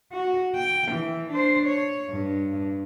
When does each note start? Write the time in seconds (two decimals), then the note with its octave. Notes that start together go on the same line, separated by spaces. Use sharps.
0.13 F#4
0.56 G5
0.92 E3
1.30 D4 C5
1.66 C#5
2.11 G2